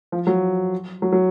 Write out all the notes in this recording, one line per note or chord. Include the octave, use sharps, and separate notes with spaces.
F3
F#3
F#3
F#3